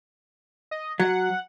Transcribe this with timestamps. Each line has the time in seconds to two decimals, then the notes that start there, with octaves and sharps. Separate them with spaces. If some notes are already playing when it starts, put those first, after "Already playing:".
0.71 D#5
1.00 F#3 F#5